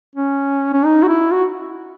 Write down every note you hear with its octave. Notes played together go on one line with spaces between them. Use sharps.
C#4
C#4
D#4
F#4
E4
F#4